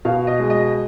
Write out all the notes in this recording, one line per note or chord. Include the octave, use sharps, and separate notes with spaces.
B2 F5
D#5
G#3
D#5